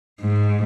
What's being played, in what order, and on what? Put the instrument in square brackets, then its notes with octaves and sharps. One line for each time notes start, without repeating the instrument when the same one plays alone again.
[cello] G#2